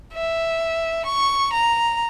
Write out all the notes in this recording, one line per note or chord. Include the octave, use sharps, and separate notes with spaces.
E5
C#6
A#5